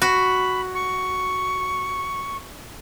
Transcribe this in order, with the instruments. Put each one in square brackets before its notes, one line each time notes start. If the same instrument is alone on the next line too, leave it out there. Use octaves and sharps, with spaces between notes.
[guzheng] F#4 [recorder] B5
[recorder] C#6